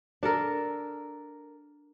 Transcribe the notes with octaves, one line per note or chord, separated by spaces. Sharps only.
D4 A4 A#4